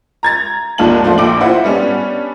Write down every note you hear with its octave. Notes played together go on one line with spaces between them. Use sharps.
A#5 G#6 A6
G#1 D#2 D4 F4 A5 F#7
F3 A3 D4 F4
A#1 G5 D6 F#7
E4 F4 C5 F#5
G3 B3 C#4 D4